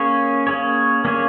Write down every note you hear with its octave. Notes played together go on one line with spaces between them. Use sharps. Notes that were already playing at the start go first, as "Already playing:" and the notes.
Already playing: A#3 C#4 G#4 C#5
A#3 C#4 G#4 C#5
A#3 C#4 G#4 C#5